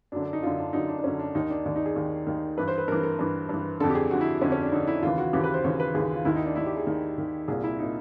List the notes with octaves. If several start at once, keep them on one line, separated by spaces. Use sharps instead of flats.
F#2 D3 D4
D4
D#4
F#2 D3 F4
D4
F#2 D3 D#4
D4
D4
F#2 D3 C#4
D4
D#2 D#3 D#4
D4
D#2 D#3 D4
D#4
G#4
D#2 D#3
D#2 D#3
G2 E3 B4
C5
B4
G2 E3 A#4
A#4
G2 E3
G2 E3
F2 D3 A4
G4
G#4
F2 D3 F#4
E4
F2 D3 C#4
C#4
D4
F2 D3 D#4
E4
D#2 C#3 E3 F4
F#4
D#2 C#3 E3 G4
B4
C5
D#2 C#3 E3 C#5
B4
D#2 C#3 E3 G#4
F4
D#2 D#3 E4
D#4
D4
D#2 D#3 E4
G4
G#4
D#2 D#3
D#2 D#3
C2 A#2 G#4
E4
A#2 D#4